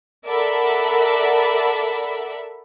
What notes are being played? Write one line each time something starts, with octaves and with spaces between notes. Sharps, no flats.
A4 A#4 D5 E5 F#5 B5